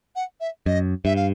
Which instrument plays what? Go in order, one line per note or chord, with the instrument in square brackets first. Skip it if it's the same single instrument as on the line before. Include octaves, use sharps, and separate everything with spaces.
[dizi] F#5
E5
[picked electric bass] F#2 [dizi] D#5
[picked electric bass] G2 [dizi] E5
[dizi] F5